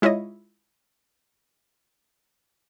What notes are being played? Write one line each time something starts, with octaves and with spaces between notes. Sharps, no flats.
G#3 E4 F4 C#5 D#5